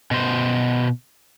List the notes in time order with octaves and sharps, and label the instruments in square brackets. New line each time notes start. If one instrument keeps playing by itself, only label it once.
[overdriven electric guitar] B2 C5